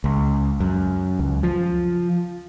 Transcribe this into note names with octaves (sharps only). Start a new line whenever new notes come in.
C#2
F#2
C#2
F3